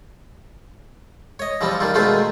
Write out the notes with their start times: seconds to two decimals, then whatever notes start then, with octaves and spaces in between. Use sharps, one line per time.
1.39 C#5 D#5
1.61 E3 F3 G3 C4
1.80 D#3 G3 F4
1.94 B2 D#3 G#3 A3 F4 C5